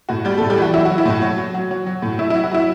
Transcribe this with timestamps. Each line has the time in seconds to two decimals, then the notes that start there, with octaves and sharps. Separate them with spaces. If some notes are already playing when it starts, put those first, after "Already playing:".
0.09 A2 F#4
0.25 G3 G4
0.38 A3 A4
0.41 A2
0.50 G3 G4
0.58 E3 F#4
0.73 F#3 E4
0.85 F#4
0.90 F#3
0.98 E4
1.06 A2 F#4
1.22 F#3
1.38 F#3
1.54 F#3
1.71 F#3
1.86 F#3
2.02 A2
2.19 F#3 E4
2.30 E4
2.34 F#3
2.44 F#4
2.51 F#3 E4